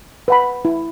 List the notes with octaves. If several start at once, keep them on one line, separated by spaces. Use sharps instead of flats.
B4 F#5 B5
E4